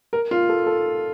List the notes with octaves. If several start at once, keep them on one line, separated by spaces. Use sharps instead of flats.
A#4
F4
A4
A4